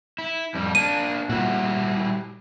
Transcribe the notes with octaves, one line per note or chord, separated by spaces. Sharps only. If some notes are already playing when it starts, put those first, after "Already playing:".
E4
F2 G3
A#3 D4 D#7
A#2 G3 E4 F#4